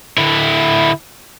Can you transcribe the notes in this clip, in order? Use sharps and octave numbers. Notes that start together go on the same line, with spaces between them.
D3 E4